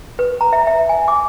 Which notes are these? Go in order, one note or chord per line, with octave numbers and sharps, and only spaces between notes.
B4
A#5
E5
E5
G#5
D6